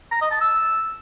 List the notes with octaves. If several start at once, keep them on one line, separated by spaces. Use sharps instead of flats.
A#5
D#5
A5
E6